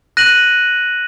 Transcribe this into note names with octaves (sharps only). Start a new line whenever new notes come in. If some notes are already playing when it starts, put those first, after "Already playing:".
F#6 A#6 D#7 F#7